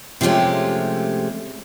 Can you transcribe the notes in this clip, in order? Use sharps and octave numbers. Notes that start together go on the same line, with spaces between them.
C3 F3 G#3 A3 C#4 G4